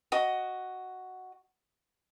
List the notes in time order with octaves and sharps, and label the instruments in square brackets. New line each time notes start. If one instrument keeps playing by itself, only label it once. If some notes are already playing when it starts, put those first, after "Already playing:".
[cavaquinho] F#4 D#5